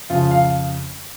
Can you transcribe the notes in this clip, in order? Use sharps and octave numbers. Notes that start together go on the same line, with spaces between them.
F2 C#3 F4
F5